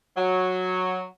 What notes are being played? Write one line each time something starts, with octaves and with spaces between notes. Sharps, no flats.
F#3